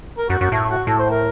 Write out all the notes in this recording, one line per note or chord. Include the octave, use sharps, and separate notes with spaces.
A#4
F#2 F#4
F#2 F#4
A2 A3
F#4
A2 A4
C5
A#4